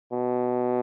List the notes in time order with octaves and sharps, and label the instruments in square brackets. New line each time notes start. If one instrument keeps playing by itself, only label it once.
[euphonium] B2